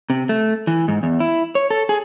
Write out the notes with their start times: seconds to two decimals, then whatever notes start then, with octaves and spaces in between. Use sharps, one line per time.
0.10 C3
0.29 A3
0.67 E3
0.88 G#2
1.03 E2
1.20 E4
1.55 C#5
1.70 A4
1.89 G#4